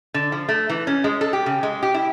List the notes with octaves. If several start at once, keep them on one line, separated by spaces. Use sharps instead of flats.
D3
F3
A3
E3
C#4
G#3
A4
G4
C#3
G#3
G4
E4